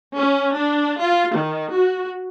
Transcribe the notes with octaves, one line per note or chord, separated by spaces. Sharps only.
C#4
D4
F4
D#3
F#4